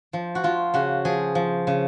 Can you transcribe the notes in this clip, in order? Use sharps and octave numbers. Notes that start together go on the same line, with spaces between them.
F3
F#4
F3 F4
C#3 F#4
F3 G#4
F3
C#3